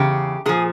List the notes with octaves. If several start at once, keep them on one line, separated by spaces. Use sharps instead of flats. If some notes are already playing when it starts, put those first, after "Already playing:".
Already playing: E2 C#3 G4
A#2 F3 G#4